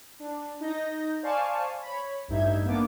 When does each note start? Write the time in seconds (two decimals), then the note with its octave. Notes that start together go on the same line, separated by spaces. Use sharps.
0.20 D4
0.61 D#4 G6 A#6
1.22 C5 D5 F5 G#5 A5 C#6
1.82 C#5 B5
2.28 A1 G2 D#4 E5 G6 G#6
2.65 A#3 B3 D4 D6